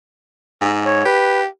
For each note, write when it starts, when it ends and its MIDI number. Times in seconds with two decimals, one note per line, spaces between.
0.61 1.01 44
0.86 1.05 73
1.05 1.45 67
1.05 1.40 71